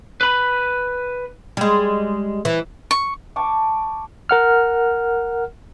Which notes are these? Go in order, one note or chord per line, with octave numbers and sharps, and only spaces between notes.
B4 B5
G3 G#3
E3
C#6
G5 A5 C#6 D6
A#4 F#5 F6